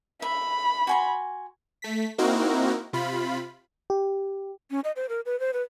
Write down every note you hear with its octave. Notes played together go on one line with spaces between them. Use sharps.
E5 B5
F#4 G#5 C6
A3 B6
A#3 C4 D#4 E4 F#4 A#4
C3 F4 B5
G4
C#4
D#5
C5
A#4
B4
C5
B4